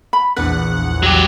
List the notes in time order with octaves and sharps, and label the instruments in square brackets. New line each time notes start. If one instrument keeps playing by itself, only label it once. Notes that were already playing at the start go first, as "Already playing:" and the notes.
[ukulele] B5
[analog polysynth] A#1 E2 F#5 [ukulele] D4 B4
[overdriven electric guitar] F#3 G4